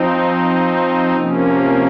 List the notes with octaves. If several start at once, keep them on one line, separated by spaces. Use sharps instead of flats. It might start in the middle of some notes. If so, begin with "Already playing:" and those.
Already playing: F3 C4 D#4
C3 F3 A#3 C#4